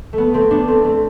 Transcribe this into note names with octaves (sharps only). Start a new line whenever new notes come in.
A3
B3
A3 C4
B3 D4
A3 C4
A3 C4